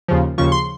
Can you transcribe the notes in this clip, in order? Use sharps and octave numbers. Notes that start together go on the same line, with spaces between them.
D#2 C#3 F3
D#2 C#3 F3 C#6
C6